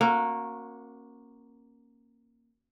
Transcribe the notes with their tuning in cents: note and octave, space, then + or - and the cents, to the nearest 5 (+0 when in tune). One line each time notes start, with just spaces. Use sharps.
A#3 +0 C#4 -35 F#4 -20